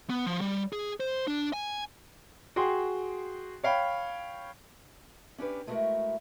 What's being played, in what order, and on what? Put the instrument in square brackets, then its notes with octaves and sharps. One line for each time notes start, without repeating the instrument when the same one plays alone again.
[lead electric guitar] B3
F3
G3
G#4
C5
D4
G#5
[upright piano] F#4 G#4 G5 C6
C#5 F5 G5 B5
[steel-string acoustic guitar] C#4 D4 G4 B4
G#3 A3 D#4 E4 F#4 A#4